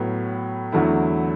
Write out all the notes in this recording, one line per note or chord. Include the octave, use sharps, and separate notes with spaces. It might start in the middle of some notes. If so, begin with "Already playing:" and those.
Already playing: A2 F#3 B3
E2 D3 F#3 A3 E4